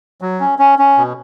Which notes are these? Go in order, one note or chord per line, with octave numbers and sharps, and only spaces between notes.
F#3
C#4
C#4
C#4
B2